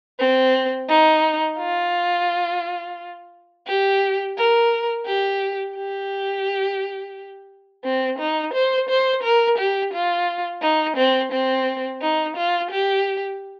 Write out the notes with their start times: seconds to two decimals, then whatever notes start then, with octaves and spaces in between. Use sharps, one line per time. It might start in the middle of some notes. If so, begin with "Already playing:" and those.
0.19 C4
0.89 D#4
1.59 F4
3.67 G4
4.37 A#4
5.06 G4
5.76 G4
7.84 C4
8.19 D#4
8.54 C5
8.89 C5
9.24 A#4
9.58 G4
9.93 F4
10.62 D#4
10.97 C4
11.32 C4
12.02 D#4
12.37 F4
12.71 G4